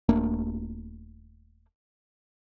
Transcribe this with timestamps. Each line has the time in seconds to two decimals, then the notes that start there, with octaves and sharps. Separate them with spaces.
0.09 D#1 A3 A#3 D4